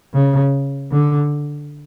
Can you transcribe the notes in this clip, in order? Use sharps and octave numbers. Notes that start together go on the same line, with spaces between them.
C#3
D3